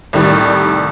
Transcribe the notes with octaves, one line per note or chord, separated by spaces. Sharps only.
C2 A2 D#3 G3